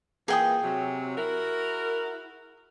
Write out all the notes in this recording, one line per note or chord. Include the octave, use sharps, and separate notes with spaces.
A#2 E3 G#4 G5 D#6
C3 F#3
E4 F#4 A#4